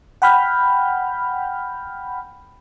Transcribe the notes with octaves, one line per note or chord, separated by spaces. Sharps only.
F#5 G5 B5 F6 G6